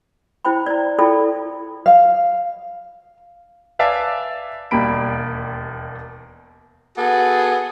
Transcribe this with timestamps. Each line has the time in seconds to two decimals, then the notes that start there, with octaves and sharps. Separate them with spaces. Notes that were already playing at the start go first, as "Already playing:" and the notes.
0.45 E4 C5 G5 B5
0.66 D5 A#5
0.98 E4 F4 A4 D5 G5 B5
1.86 F5
3.79 B4 D5 E5 F5 G#5 A5
4.71 E1 D#2 G3 A#3 B5 D7
6.97 B3 F#4 G#4 A4